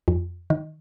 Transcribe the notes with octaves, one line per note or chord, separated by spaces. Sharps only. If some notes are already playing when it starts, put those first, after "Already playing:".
F2
D#3